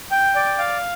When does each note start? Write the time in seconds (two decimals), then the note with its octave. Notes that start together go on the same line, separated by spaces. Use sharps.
0.11 G5
0.35 D5
0.58 F5